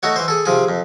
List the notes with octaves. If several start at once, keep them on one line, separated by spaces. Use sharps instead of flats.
A3 D#4 F#4 C#5
E3 C5
G#4 A4
C3 F3 G#4
F2